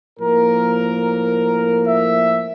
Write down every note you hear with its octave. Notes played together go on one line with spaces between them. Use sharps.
A2 F3 A#3 A#4
E5